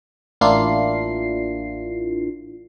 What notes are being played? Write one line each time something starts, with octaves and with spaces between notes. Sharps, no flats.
A1 A#3 D4 E4 F4 C7